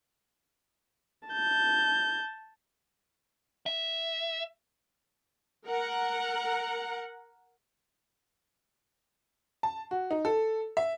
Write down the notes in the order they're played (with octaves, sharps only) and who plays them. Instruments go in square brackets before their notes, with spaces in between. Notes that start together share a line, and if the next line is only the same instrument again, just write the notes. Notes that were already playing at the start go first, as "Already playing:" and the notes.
[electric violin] A5 G6
[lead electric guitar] E5
[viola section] A#4 F#5
[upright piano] A5
F#4
D#4
A4
E5